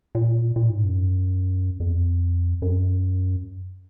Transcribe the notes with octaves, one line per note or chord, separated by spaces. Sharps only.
A#2
A#2
G#2
F#2
F2
F#2